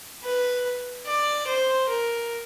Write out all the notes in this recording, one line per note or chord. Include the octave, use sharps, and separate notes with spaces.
B4
D5
C5
A#4